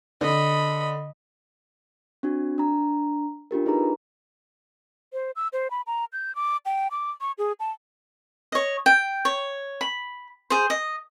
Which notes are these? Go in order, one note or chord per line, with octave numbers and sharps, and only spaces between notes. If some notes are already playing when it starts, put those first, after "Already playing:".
D3 D#5 B5
C4 D4 F#4
D4 A#5
D4 F4 G4 A#4
D#4 G#4 B4 A#5
C5
E6
C5
B5
A#5
G6
D6
G5
D6
C#6
G#4
A5
C#5 D#5
G5
C#5
B5
G#4 C5
D#5